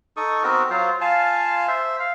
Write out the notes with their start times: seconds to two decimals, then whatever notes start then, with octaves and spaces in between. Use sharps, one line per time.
0.17 D#4 A4 C#6 D#6
0.43 B3 C4 F#4 A#4
0.70 F#3 F4 C5
1.01 F4 F5 G#5 A5
1.68 C5 E5
1.99 F5